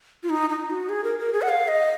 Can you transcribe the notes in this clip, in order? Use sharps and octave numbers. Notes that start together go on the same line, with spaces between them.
F4
D#4
D#4
F#4
G#4
A#4
A#4
G#4
F#5
F5
D#5